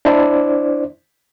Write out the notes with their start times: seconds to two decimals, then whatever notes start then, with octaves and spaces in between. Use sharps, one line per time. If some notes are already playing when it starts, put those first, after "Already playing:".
0.05 D4 E4 C5 D5